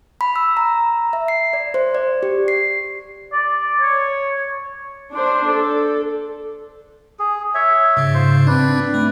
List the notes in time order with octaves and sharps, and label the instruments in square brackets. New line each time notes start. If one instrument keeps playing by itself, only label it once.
[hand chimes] B5
E6
A#5
E5
C7
D5
C5
D5
G4
C7
[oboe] D5
C#5
[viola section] D4 C5
A4
[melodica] G#4
C#5 E5
[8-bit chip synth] G#2 C#3
[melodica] F4 C5
[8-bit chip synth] C4 D4 [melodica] B4 D5
[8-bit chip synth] A3